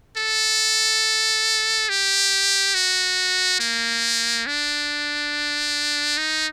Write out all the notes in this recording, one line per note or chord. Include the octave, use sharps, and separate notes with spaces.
A4
G4
F#4
A#3
D4
D#4